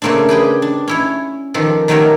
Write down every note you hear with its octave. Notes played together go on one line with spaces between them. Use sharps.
C#3 A3 A#3 C4 D4
G4 G#4 B4 G5
D4
C#4 E4 C#5
D#3 F3 G4 A4
D#3 F#3 A3 G4 A#4 C#5